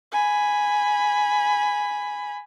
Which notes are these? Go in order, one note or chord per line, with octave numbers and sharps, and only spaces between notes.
G#5 B5